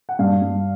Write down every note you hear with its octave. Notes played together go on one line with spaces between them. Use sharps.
F#5
G2 F5
G2